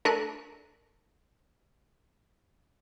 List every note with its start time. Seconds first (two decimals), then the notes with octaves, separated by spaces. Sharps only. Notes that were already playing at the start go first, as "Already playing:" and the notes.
0.05 A3 D4 A#4 F#6 D#7